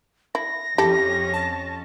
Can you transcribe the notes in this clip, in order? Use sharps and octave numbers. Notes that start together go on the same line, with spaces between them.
E4 A#6
F2 C#4 E4 G4 A4
A5